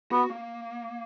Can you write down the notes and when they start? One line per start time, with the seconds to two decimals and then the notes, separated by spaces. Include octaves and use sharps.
0.11 B3 F#4
0.30 A#3